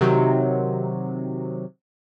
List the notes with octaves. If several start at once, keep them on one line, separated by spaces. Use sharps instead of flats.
C3 D#3 F#3